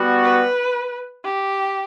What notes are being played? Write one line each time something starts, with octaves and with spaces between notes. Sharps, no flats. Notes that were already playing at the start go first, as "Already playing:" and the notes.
Already playing: G3 B3 F#4
B4
G4